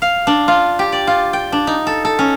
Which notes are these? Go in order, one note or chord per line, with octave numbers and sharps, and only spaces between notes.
F5
D4
F4
G4
D5
F4
G5
D4
D#4
A4
A4
C#4